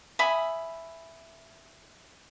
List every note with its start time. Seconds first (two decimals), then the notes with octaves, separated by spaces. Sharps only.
0.19 E5 G#5 B5 D#6